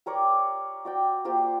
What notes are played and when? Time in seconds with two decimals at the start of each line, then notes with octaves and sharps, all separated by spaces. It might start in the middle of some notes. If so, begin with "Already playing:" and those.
0.06 G4 A#4 C#5 D5
0.85 F#4 D5 G5
1.25 A#3 F4 G4 C5